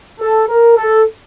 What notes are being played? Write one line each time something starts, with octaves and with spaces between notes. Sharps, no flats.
A4
A#4
A4